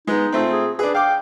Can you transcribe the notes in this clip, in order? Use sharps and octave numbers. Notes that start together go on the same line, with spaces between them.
G#3 B3 D#4
A#2 A3 C4
G#4
D4 G#4 B4
F5 G5 D6